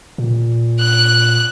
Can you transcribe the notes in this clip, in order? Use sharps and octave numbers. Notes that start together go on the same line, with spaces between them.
A#2
F#6